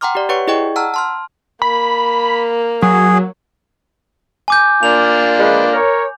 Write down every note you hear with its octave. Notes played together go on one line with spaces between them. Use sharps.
F#5 G5 A#5 C6 D6 F6
G4 D5
G4 B4 C#5 F#5 C#6 C#7
E4 G#4 D5 D#5 G5 C#6
F#5 A5 A#5 E6 F6
A5 C6 F6
A#3 B5
F#3 G#4
G#5 D6 G6
A#3 D4 F4 F7
F3 G#3 B4
A#4 C#5